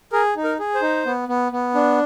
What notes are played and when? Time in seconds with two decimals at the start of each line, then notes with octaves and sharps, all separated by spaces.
0.13 G#4 A#4
0.36 D#4
0.44 A#4
0.59 G#4
0.75 C5
0.82 D#4
1.06 B3
1.28 B3
1.52 B3
1.75 D4